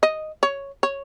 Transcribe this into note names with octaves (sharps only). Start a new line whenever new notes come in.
D#5
C#5
C#5